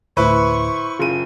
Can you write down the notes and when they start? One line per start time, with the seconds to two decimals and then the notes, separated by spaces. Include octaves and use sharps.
0.17 D2 A2 E4 B4 C5 C#6
0.99 F#1 F4 G#4 D#7